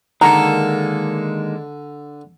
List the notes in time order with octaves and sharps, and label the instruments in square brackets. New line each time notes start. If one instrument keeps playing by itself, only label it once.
[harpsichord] D3 [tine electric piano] D#3 [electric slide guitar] G#3 A#3 A4 [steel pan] A#5